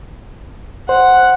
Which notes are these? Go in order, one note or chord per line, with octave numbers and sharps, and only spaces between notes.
C5 F#5